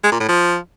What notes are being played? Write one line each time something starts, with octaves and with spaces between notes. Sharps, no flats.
G#3
A#2
A2
F3